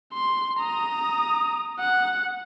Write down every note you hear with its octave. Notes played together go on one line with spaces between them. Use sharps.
C6
A#5 D#6
F#5